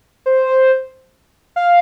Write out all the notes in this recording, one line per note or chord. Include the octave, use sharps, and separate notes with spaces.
C5
F5